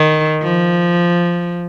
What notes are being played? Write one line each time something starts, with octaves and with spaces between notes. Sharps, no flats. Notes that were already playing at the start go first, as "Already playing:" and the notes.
Already playing: D#3
F3